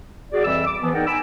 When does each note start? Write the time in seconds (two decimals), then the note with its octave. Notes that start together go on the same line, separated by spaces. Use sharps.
0.32 F#4 G#4 D5
0.45 F2 E3 G3 D5 E5 E6
0.66 D6
0.82 E3 F3 B3
0.94 D#4 G#4 A#4 D5 F#5 G5
1.06 G#5 A#5 B5 D6 E6